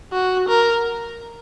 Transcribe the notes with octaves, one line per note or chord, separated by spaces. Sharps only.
F#4
A#4